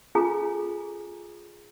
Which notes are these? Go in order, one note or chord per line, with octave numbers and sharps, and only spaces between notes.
C#4 F4 G#4 A4 G#5 A#5